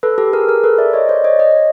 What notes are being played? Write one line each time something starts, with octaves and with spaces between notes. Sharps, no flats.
A4 B4
G4 A4
G#4 A#4
G#4 A#4
A4 B4
D5 E5
C#5 D#5
C5 D5
C#5 D#5
C#5 D#5